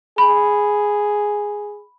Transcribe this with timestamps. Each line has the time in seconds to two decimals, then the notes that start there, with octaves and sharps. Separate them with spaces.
0.18 G#4 B5